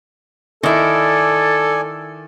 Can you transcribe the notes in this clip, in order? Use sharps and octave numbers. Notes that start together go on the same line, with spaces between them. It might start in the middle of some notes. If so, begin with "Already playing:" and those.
D#3 E4 A4 D5 G#5